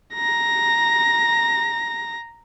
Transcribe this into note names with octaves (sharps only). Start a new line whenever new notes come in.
A#5 A#6